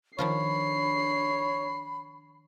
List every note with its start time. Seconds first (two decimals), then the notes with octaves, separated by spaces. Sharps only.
0.19 D#3 F3 D4 F4 C#5 B5 C7